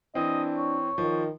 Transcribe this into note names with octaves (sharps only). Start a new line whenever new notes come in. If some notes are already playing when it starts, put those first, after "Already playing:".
E3 C4 D4 D#5
C#5
D#3 F3